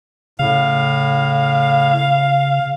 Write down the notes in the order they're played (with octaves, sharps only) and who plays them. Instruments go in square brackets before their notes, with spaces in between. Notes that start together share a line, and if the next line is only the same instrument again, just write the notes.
[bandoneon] A2 [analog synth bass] C#3 [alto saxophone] F5